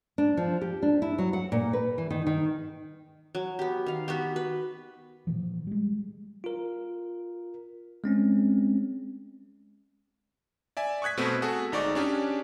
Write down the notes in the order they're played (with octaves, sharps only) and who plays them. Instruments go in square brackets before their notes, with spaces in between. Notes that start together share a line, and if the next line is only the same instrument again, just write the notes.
[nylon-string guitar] D4
F3
G4
D4
E4
F#3
F#5
A#2
B4
E3
D#3
D#3
[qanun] F#3
B3 G4
D#3 F5
B3 F#4 G4
B4
[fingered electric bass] A#2 E3 F3
G3 G#3
[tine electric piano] F4 A#4
G#3 C4 C#4
[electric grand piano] D5 E5 G#5
C#6 D#6 F#6 G#6 B6
B2 A3 B3 C4
F#4 G#4 A4
G#1 D#4 D5 C#6 D6
C#4 D4 G4 G#4